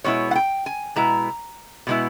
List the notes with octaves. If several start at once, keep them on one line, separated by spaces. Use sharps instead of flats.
B2 G#3 B3 E4 C#5
F#5
G5
G#5
B2 G#3 B3 E4 A#5
B2 G#3 B3 E4